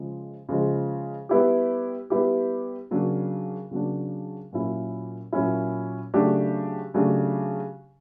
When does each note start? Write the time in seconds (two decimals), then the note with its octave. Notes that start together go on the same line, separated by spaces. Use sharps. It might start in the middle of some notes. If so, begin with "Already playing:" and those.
Already playing: C#3 F3 G#3
0.49 C#3 F3 G#3
1.29 G3 B3 E4 G4
2.10 G3 B3 E4 G4
2.91 C#3 F#3 A#3 D4
3.71 C#3 F#3 A#3 D4
4.52 A#2 F#3 A#3 C#4 E4
5.32 A#2 F#3 A#3 C#4 E4
6.14 C#3 F#3 A3 D4 G4
6.94 C#3 F#3 A3 D4 G4